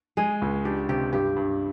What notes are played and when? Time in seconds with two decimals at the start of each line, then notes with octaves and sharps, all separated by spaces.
0.17 G#3 G#4
0.42 C#2
0.65 D4 G4
0.89 C3 G4
1.12 G2 G4
1.37 G2